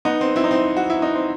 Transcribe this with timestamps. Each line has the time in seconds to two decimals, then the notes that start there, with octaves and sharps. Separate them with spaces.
0.05 B3 D#4
0.21 C4
0.36 C4 E4
0.44 D#4
0.51 C4
0.77 F#4
0.90 E4
1.02 D#4
1.15 C4